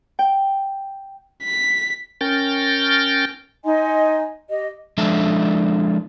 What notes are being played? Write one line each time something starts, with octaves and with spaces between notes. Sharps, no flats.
G5
B6
C#4 A#4 G5 F6 G6 A6
D#4 D#5 G#5 C6
G4 D#5
F3 G#3 D4 A4 E5